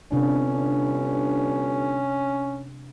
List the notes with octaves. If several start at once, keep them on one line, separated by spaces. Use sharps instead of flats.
G1 C3 C#4 D4